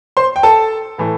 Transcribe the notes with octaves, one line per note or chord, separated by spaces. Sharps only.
C5 C6
G5
A4 A5
A2 E3 A3